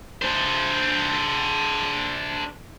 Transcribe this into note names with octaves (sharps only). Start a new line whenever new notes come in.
D4 C5